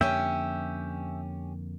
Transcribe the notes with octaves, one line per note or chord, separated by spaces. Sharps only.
F2 D3 A#3 C#4 G4 E5 G5